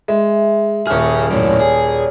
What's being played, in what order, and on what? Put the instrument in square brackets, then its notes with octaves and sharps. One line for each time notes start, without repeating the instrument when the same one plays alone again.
[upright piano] G#3 [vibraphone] E5
[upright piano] D#1 F6 [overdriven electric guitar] G#4 C#5
[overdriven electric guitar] F#2 A2 [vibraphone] C#5 D5
[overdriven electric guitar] G#4